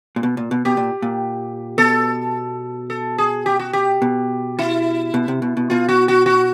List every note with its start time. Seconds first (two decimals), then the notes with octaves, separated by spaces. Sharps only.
0.16 A#2
0.23 B2
0.37 A#2
0.51 B2
0.65 B2 G4
0.77 A#2
1.02 A#2
1.78 B2 A4
2.90 A4
3.18 G#4
3.46 G4
3.59 F#4
3.73 G4
4.02 B2
4.59 E4
5.14 B2
5.28 C3
5.42 B2
5.57 B2
5.70 B2 F4
5.89 F#4
6.08 F#4
6.26 F#4